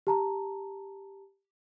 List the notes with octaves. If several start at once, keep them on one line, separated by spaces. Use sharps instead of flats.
G4 A5 A#5